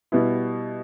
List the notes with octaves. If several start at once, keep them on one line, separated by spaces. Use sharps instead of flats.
B2 G3 B3 E4